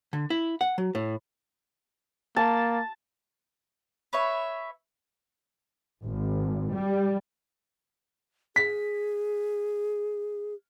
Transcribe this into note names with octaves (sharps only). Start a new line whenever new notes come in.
D3
E4
F#5
F#3
A2
A#3 A5
B4 C#5 E5
G#1
G3
G#4 B6